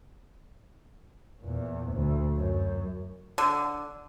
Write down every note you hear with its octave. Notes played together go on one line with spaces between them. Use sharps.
E2 A#2
D2
F#2
D3